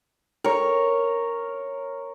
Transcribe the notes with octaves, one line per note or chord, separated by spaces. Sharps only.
A#4 C#5